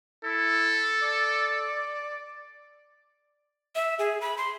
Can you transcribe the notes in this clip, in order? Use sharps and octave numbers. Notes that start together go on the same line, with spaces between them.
E4 A4
D5
E5
G#4
B5
C6